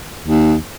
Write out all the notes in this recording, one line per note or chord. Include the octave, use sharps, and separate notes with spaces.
D#2